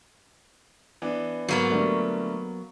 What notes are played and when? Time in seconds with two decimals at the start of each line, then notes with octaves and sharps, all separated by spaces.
1.02 E3 B3 D4
1.48 G#2 F#3 A#3 B3
1.70 D3 G3 A3